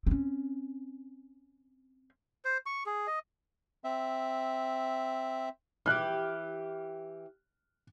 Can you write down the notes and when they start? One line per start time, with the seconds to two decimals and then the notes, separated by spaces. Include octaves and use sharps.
0.07 C4 C#4
2.45 C5
2.66 C#6
2.86 G#4
3.07 D#5
3.84 C4 E5
5.86 E3 G4 F6 F#6